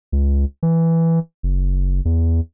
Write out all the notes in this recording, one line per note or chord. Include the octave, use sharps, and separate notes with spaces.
C#2
E3
F#1
E2